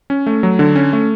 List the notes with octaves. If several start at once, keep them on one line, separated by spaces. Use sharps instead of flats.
C#4
A3
F#3
D3
C#4
A3